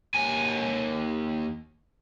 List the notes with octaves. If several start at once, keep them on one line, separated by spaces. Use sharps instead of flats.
D#2 G#5